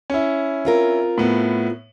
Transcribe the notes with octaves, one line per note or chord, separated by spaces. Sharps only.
C#4 E4
C4 F4 A#4
A2 A3 B3